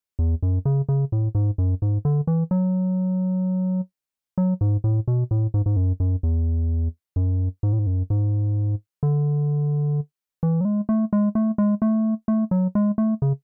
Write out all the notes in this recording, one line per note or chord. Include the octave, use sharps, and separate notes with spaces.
E2
F#2
C#3
C#3
A2
G#2
F#2
G#2
D3
E3
F#3
F#3
G#2
A2
B2
A2
G#2
G#2
F#2
F#2
E2
F#2
G#2
A2
G#2
F#2
G#2
D3
E3
F#3
G#3
A3
G#3
A3
G#3
A3
A3
F#3
G#3
A3
C#3